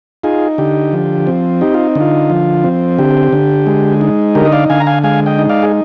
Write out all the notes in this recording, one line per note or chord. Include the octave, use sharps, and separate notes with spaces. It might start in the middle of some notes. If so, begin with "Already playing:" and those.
D#4 F4 G#4
D3 G4
F3
C4
D#4 G4
F4
D3
F4
F3
C4
D3 G4
D3
G#3
D#4
D3 G4 A#4
D#5
D5 F5
D3 F5 G#5
A#5
F5 G#5
G#3 F5 G#5
D#5 G5
D#4
D5 F5
G#4